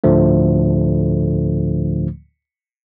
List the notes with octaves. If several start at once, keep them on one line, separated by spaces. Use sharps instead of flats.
D2 A2 D3 F3 A3